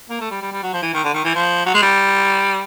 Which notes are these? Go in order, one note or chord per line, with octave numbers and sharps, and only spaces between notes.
A#3
A3
G3
G3
G3
F#3
F3
E3
D#3
D3
D#3
E3
F3
F#3
G#3
G3